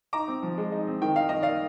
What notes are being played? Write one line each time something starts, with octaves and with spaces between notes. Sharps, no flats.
D#4 A#5 D6
C4
F3
G#3
D#4
C4
D#3 G5
D#4 F5
D#3 D#5
A#3 D5 F5